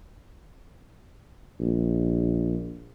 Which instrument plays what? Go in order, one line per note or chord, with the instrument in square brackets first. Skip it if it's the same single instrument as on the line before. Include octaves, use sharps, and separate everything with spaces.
[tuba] A#1